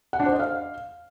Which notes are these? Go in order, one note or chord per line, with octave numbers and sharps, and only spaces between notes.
F#5
D4
C5
D#5
F5